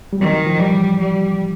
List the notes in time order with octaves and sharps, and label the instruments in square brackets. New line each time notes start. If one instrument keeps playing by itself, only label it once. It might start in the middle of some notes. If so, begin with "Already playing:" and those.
[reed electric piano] G3
[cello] D#3 [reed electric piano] F#3
[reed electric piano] F3
[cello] G3
[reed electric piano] E3
[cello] G3